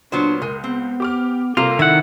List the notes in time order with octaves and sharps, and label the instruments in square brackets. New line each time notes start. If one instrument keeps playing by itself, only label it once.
[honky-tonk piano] A#2 [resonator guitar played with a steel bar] F#3 B3 C5 [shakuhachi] D4
[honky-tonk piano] C#2 [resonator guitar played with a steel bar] G#3 [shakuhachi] A#4
[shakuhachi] B3 [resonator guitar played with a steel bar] C4
[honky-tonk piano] G4 D6 F6
[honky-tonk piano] C2 C3 [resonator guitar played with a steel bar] A#3 [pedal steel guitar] F4 [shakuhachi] A4
[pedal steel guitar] D#3 F#5 [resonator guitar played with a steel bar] E4